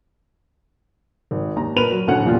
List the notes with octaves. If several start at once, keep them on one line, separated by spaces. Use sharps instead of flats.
G#1
D#2 A#5
A#2 A#4 B4 B5 D#7 F7
F#3
D#1 D2 A2 C#4 F#5 F#6
E2 A#2 F4 G4